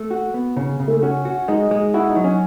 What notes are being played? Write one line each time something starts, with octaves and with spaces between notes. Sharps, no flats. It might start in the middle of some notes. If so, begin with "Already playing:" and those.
Already playing: A3
F#4
B3
C#3 C#4
C#3
A3
C#4 F#4
F#4
G#3 D#4
G#3
E4 F#4
D#4
F#3
C#4